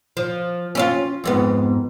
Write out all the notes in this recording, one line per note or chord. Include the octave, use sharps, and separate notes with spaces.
F3
C#4 E4 F4
F2 G#2 B3